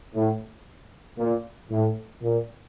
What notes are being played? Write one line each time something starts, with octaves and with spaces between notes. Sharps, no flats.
A2
A#2
A2
A#2